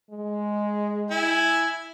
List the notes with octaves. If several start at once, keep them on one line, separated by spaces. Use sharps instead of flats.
G#3
E4 G#5